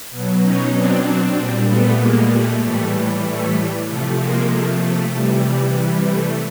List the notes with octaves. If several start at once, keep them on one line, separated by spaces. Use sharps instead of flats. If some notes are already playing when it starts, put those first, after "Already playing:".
B2 F#3
C#4 D#4
C4 D4
A#2 G3
A3 B3
G#3 A#3
A3
A2 E3 G3 A3
A3
C3 F3 A3
G#3 A#3
A3
A3
C3 E3 G3
A3